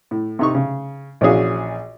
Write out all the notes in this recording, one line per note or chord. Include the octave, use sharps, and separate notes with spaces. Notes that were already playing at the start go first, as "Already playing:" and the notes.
A2
C3 D#4 C#6
C#3
A#1 E3 C#4 F#4 G#4 F5